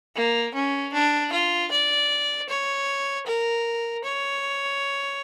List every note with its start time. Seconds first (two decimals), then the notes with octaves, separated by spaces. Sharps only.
0.15 A#3
0.54 C#4
0.93 D4
1.32 F4
1.71 D5
2.48 C#5
3.26 A#4
4.04 C#5